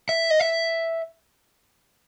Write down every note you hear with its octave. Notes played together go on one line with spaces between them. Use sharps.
E5
D#5
E5